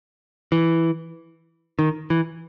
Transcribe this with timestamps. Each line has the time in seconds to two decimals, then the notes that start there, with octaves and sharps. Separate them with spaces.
0.52 E3
1.79 D#3
2.10 E3